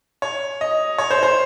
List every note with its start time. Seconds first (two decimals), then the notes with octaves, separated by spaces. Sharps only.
0.22 C#5
0.61 D#5
0.98 C#5
1.11 C5
1.23 C5